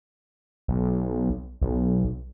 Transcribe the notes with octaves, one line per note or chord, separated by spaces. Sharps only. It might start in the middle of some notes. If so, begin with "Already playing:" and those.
B1
B1